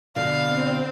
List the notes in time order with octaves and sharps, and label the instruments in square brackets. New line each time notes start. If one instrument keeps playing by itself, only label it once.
[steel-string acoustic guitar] B2 D3 [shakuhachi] D5 [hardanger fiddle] F5
[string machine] C4